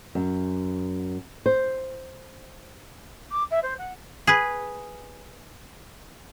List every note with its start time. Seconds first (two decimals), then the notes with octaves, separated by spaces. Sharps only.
0.15 F#2
1.46 C5
3.31 D6
3.51 E5
3.63 C5
3.79 F#5
4.27 G#4 B4